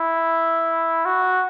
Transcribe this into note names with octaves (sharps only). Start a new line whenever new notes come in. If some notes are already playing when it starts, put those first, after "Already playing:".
Already playing: E4
F#4